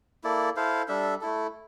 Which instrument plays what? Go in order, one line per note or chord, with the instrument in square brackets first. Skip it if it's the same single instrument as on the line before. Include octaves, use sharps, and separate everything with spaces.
[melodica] A#3 E4 A4 D5
E4 A4 C5 F5
G3 D4 A4 E5
A3 E4 A4